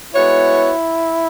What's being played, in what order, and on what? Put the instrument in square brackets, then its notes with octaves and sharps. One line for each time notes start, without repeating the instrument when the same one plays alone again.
[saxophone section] G#3 B3 F#4 C#5 [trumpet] E4